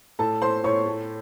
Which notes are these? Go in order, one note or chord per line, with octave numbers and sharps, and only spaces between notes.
A2 A4 A5
A2 C5 C6
A2 C#5 C#6
A3